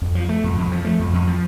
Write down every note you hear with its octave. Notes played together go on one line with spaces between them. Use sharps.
F2
F3
A3
F2
F2
F3
A3
F2
F2
F3